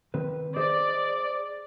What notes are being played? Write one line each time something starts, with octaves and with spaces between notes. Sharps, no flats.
D#3 C4 B4
G#4 C5 D5 D#5